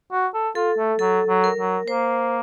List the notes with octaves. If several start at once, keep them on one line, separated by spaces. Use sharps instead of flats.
F#4
A4
F4 A4
A3
F#3 A4
F#3
A#4
F#3
A#3 C5